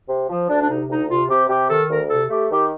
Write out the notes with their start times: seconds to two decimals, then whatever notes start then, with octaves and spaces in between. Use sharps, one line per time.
0.08 C3
0.28 F3
0.48 D2 D4
0.61 D4
0.68 C3 D#4
0.88 D2 D#4
1.09 C3 F4
1.28 C3 G4
1.49 C3 G4
1.68 D#3 A4
1.88 D2 A#4
2.09 C3 A4
2.29 A3 G4
2.50 D#3 G4